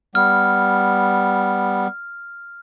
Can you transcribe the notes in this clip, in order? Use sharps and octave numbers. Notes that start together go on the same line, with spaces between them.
G3 B3 F6